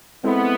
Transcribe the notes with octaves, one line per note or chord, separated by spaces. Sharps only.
G#3 B3 C4 E4 A4